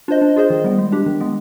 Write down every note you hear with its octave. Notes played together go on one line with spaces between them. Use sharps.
D4 F4 C5 D#5
D4
F4 G#4 C5 D#5
D#3
G3 B3
G#3
D4 G4
D#3
G#3 B3